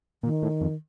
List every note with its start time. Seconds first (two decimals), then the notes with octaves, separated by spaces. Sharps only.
0.23 A#2 D#3
0.42 A2
0.61 F2